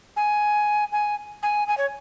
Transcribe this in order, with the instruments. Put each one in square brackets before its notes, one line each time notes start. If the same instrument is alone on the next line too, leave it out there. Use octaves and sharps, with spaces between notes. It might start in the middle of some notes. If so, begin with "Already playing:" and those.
[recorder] G#5
G#5
G#5
G#5
C#5